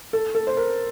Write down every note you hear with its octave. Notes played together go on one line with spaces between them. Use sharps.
A4
A4
C5
A#4